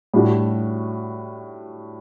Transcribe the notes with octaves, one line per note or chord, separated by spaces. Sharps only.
A2 G3 D4 F#4